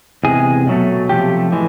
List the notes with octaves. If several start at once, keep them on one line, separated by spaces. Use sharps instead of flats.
E2 C3 G#3 G#4
B2 F#3 A3
C3 F3 A3 G4
A2 E3 G#3